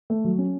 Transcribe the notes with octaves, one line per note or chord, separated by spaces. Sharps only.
A3
F#3
C#4